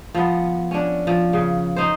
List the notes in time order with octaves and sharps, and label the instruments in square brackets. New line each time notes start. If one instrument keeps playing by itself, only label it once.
[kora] F3 B3
C#4 D4
F3
C#3
D#4 C5